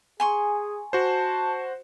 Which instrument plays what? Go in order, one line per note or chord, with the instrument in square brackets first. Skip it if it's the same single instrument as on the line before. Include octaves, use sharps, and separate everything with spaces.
[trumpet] G#4 [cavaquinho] G#5 C6 C#6
[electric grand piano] F#4 C5 [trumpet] A5